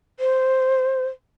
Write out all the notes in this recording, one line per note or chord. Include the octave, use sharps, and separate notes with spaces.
C5